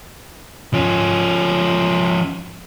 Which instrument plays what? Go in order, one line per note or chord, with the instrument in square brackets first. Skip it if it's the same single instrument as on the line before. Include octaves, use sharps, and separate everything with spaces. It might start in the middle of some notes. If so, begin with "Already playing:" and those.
[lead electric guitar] F3 C#4